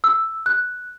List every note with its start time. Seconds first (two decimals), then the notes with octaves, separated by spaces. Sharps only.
0.04 E6
0.46 F#6